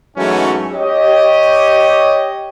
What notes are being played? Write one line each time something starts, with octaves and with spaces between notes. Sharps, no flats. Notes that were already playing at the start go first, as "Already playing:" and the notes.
G#2 E3 F#3 G#3 A3 C#4
G4 C#5 D#5